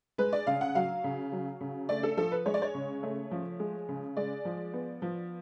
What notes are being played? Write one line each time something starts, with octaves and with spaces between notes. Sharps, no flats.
G#3 B4
D5
C#3 F5
F#5
F#3 F5
C#3
F#3
C#3
A3 D5
A4
F3 A4
B4
G#3 C#5
D5
C#5
C#3
A3
F3
G#3
C#3
G#3 D5
F3
B3
F3